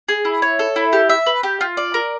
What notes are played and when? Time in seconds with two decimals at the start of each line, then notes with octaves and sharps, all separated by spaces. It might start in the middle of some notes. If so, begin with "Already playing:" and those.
0.09 G#4
0.25 E4
0.42 C#5
0.59 A4
0.76 E4
0.93 G4
1.09 E5
1.26 B4
1.43 G4
1.61 F4
1.77 D5
1.94 A#4